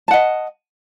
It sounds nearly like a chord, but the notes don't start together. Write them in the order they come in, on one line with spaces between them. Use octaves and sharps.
A5 F#5 D#5